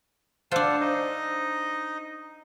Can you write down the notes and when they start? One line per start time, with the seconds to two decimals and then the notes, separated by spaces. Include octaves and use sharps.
0.51 D4 F4 C5 F5 F#5 A5 E6
0.80 D#4 D#5